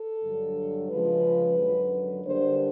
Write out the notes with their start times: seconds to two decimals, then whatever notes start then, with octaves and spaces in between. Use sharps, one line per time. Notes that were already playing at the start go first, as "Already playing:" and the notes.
Already playing: A4
0.23 G2 D3 F#3
0.90 C#3 F3 G#3 B4
1.58 F#2 D3 F#3
2.25 D3 G3 A#3 D4 C5